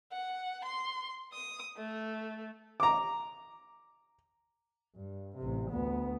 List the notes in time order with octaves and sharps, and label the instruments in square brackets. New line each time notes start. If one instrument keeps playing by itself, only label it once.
[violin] F#5
C6
D#6
A3
[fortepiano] A#5 D6
[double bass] G2
A1 C3
D2 B3